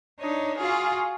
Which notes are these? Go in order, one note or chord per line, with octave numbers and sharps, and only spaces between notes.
D4 D#4 C#5 D#5
F4 F#4 G#4 F5